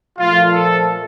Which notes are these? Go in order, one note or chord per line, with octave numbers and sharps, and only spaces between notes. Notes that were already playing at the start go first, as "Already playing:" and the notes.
A#2 F3 A3 F4
A4